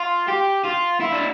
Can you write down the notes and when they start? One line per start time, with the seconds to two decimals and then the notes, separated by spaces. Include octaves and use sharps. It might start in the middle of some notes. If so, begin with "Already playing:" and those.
Already playing: F4
0.28 G4
0.64 F4
1.00 E4
1.12 D4